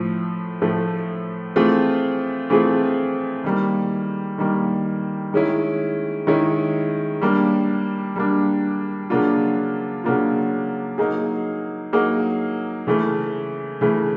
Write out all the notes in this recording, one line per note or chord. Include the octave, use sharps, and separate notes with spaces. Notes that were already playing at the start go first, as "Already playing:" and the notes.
Already playing: A2 F3 A3
A2 F3 A3
E3 A3 C4 F4 G#4
E3 A3 C4 F4 G#4
D#3 G3 A#3
D#3 G3 A#3
D#3 G#3 C#4 E4
D#3 G#3 C#4 E4
G3 A#3 D4
G3 A#3 D4
C#3 F#3 A#3 D4 F4
C#3 F#3 A#3 D4 F4
F#3 A#3 D#4 G#4
F#3 A#3 D#4 G#4
C#3 E3 A3
C#3 E3 A3